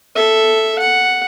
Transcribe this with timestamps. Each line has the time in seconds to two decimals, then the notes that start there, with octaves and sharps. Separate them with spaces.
0.15 A4 E5
0.79 F#5